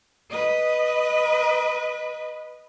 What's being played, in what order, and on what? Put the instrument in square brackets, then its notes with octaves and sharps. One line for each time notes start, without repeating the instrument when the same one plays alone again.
[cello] B4 D#5